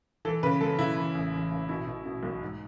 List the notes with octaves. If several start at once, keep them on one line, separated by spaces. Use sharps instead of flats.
E3 A4
C#3 B4
F#2 A4
C#3 E4
E3
A1
A1
A1
B2 E4
B2
B2
B1
G#2